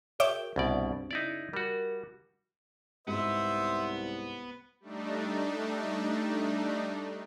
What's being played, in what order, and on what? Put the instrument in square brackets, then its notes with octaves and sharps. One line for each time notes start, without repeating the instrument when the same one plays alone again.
[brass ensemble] F#4 G#4 A#4 [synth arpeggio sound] C#5 E5 D6 [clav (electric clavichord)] G5
[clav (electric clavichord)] C2 B2 D5 [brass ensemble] G2 G3 C4
[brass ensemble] F#1 [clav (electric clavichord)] D#4 E4 D5
[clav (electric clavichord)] G3 F#4 [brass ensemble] A#4
[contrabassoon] C2 [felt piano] G#2 [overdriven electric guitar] B3 [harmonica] C5 E5
[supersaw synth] G3 A3 D4 D#4